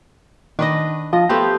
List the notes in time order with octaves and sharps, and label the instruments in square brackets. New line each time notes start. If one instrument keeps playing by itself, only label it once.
[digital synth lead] D#3 [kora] D4 B4 D#5
[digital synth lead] F3 [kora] D#5
[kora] A3 B3 C5 [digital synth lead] G4